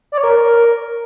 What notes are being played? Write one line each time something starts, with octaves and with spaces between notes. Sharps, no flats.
D5
C#5
A#4